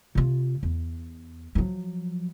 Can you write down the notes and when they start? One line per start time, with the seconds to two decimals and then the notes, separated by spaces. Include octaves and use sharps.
0.15 C3 F4
0.63 E2
1.55 F3 F#3